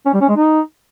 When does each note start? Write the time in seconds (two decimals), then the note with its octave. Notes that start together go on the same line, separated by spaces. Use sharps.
0.06 C#4
0.14 G3
0.21 C#4
0.29 G#3
0.36 D#4